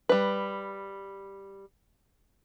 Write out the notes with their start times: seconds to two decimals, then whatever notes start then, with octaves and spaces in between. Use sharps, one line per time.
0.09 G3 B4